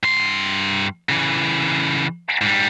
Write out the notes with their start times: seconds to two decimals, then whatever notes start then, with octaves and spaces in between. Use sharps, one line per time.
0.03 G2 C6
1.09 C#3 E3
2.41 G#2 G3